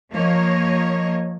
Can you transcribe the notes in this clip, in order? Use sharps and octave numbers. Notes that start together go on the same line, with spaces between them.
F3 A#3 C#5 D#5